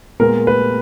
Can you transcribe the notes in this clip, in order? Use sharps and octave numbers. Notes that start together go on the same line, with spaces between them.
A#2 G#3 B3 A#4
B4